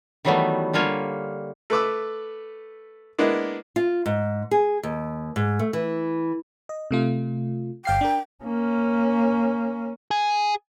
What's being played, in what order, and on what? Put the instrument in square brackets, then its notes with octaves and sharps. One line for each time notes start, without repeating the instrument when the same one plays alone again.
[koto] D#3 E3 F#3 G3 A3 B3
D3 G3 A#3 F4 C#5
[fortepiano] A3 B4 D6 E6
G#3 A#3 B3 D4 E4
[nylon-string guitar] F4
G#2
G#4
D#2
G#2
A3
E3
[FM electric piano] D#5
C3 A3 F4
[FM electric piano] G1 F5 C7 [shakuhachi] G5
[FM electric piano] D4 A#4
[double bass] A#3 C#4
[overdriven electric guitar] G#4